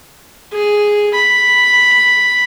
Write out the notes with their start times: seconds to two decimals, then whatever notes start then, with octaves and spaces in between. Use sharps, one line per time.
0.53 G#4
1.14 B5